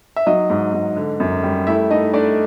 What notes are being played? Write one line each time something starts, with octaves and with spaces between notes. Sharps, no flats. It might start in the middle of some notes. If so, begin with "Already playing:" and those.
E5
F#3 D#4 D#5
G#2
G#2
D3
F#2
G3
A3 E4 E5
A3 D#4 D#5
A3 D4 D5